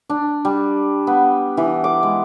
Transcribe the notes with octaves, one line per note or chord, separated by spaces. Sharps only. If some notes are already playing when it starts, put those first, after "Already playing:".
D4
G3
B3
E3
D6
G#3